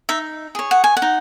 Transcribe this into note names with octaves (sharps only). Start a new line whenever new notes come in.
D#4 E5
G#4 C#5
F#5
G#5
F#5
D#4